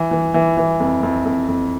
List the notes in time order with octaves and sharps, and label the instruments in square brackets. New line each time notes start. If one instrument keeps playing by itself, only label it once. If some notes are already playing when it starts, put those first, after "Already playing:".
Already playing: [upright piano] E3
E3
E3
E3
F2
F2
F2
F2